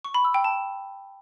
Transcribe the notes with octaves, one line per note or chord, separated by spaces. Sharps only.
C#6
B5
E6
G5
A5